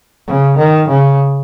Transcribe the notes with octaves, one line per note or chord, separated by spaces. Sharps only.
C#3
D#3
C#3